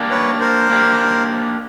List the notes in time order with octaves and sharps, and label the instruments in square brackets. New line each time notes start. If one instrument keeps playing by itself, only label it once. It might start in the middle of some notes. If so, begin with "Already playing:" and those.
Already playing: [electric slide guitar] A#3 D4 G4
[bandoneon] B4 C#5
A#4 C5
[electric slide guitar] A#3 D4 G4